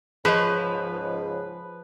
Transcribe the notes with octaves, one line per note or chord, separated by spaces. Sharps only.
C#2 G#2 C#3 F3 G#4 B4 D#5